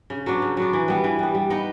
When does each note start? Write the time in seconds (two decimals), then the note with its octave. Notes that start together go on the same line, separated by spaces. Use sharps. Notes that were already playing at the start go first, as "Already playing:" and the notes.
0.10 C#3
0.26 F#3 B3 D4
0.42 C#3
0.57 F#3 B3 D4
0.73 E3
0.88 G3 B3
1.04 E3
1.19 G3 B3
1.34 G3
1.50 B3 D#4